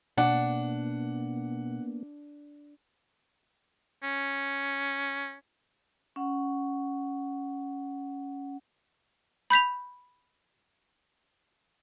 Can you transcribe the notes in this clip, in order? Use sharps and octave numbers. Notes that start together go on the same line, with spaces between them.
B2 A#3 B3 D4 F#5
C#4
C#4 F#5
B5 G6 B6 F7